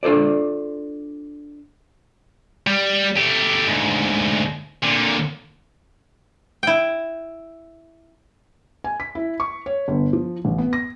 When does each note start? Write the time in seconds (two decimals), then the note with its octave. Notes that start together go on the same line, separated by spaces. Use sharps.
0.03 D4 F4 A4 C5 D5
2.67 G3
3.16 A3 G4
3.67 D2 G#2
4.83 A#2 D3
6.63 E4 G5
8.84 G#5
9.00 B6
9.15 E4
9.40 C#6
9.66 C#5
9.88 G1
10.13 F3
10.45 A1
10.58 B3
10.73 A#6